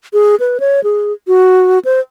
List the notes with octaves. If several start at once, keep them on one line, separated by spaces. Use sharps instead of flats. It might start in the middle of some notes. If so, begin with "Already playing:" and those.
G#4
B4
C#5
G#4
F#4
C5